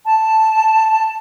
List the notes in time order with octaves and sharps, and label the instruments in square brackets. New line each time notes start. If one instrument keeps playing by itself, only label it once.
[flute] A5